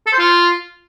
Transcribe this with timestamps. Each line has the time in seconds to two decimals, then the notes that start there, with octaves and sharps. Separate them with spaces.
0.06 A4
0.13 C5
0.19 F4